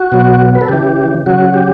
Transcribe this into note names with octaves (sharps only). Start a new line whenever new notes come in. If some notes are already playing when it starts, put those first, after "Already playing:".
Already playing: F#4
B2 F#3
B4
A4
C#3 E3 G4
C#3 F#3 F#4
G4